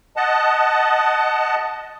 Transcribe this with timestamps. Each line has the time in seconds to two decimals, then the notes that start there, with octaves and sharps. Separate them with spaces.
0.16 D#5 F#5 A5